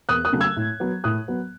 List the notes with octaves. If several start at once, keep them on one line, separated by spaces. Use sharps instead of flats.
E2 D#6 F#6
D#6 F#6
C#3 F#3 A3
E6 G#6
A2
F#3 B3
A2 D#6 F#6
F#3 B3